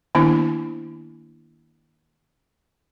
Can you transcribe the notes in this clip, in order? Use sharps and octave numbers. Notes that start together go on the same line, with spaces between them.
D#3 A#3 B3 D4 E4